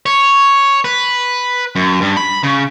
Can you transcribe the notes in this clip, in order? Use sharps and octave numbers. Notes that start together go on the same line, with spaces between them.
C#5
B4
F#2
G2
B5
C#3